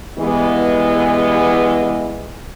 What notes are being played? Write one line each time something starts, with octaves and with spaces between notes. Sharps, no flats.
E3 G3 G#3 B3